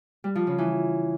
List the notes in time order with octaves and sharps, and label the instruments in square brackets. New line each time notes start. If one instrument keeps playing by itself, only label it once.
[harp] G3
F3
C#3
E3